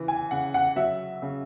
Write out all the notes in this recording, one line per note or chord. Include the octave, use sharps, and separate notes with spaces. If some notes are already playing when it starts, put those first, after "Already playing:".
Already playing: C#3 E3
G#5
C#3 F#5
F#5
F#3 E5
C#3